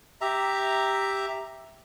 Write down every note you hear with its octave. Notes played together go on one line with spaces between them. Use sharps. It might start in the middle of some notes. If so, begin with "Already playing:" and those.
G4 E5 A#5